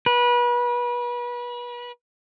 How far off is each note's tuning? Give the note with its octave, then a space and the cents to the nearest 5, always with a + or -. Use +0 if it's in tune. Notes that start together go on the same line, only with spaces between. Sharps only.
B4 -30